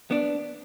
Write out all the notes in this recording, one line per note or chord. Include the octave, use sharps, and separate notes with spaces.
B3 D4